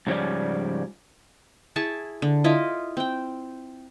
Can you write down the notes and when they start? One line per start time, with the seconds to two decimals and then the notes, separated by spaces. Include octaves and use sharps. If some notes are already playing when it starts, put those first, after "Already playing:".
0.07 G#2 C#3 F3 G3 C#5 D5
1.76 E4 G#4 A5 C#6
2.22 D3
2.44 E4 F4 D#5
2.97 C4 G5